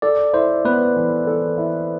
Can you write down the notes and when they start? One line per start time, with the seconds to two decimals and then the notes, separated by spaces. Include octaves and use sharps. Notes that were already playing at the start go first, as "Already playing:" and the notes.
0.02 A4 D5
0.33 E4 C5
0.65 B3 B4
0.96 E3
1.27 A4
1.58 E4